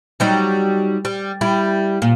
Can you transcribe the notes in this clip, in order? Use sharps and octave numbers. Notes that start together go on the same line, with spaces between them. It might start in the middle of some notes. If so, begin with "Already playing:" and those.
F#3 G3 D#4
G3
G3 E4
A#2